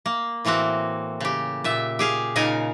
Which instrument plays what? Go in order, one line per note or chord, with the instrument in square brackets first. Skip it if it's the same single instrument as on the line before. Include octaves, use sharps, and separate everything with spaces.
[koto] A#3
A2 E3 A#3 C4 F#4
C#3 G4
A#2 E5
G4 G#4 F5
A#2 C#3 D#4 A#4 G#5